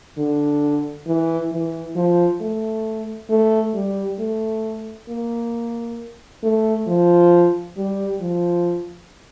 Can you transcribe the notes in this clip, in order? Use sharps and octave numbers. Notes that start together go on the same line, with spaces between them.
D3
E3
E3
F3
A3
A3
G3
A3
A#3
A3
F3
G3
F3